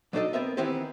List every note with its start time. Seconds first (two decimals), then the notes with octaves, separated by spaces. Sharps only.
0.13 F#3 D4 D#4 A4 D5 D#5
0.33 B3 C4 A#4 E5
0.57 D#3 E3 B3 C4 E4 G4